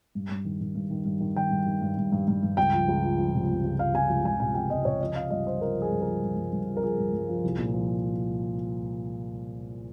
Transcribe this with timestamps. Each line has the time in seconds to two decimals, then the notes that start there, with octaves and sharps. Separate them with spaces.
0.15 G2
0.30 G2
0.45 D#3
0.61 D#3
0.75 G2
0.90 D#3
1.05 G2
1.20 D#3
1.36 D#3 G5
1.51 G2
1.66 D#3
1.82 G2
1.97 G2
2.12 G2
2.28 G2
2.43 G2
2.57 C#2 G5
2.73 F3
2.88 C#2
3.03 F3
3.18 F3
3.34 C3
3.49 C#2
3.64 C#2
3.79 F3 F5
3.94 C#2 G#5
4.10 C#2
4.25 C#2 G#5
4.40 C3 G#5
4.54 C#2 G5
4.70 C#2 D#5
4.85 C3 C#5
5.01 F3 D#5
5.15 F3 F5
5.30 G2 D#5
5.46 F3 C5
5.61 F3 A#4
5.76 F3
5.82 G#4
5.91 G2
6.02 A#4
6.07 F3
6.23 G2
6.37 G2
6.53 G2
6.67 F3
6.77 A#4
6.83 F3 G#4
6.98 G2
7.13 G2
7.29 F3
7.44 C2
7.58 A#2
7.74 F3